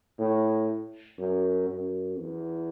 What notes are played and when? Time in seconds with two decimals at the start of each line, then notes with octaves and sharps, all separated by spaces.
0.19 A2
1.19 F#2
1.69 F#2
2.19 E2